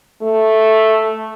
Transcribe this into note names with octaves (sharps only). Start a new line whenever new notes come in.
A3